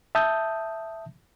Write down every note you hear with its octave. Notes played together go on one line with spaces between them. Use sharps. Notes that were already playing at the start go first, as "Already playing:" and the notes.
E5 A5 D#6 G6